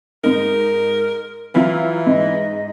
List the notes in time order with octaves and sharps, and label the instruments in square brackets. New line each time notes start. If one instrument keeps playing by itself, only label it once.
[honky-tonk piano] G#2 D#4 [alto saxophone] A#4
[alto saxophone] E3 [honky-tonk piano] F#3 E4 F4
[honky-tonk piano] G#2 [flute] D#5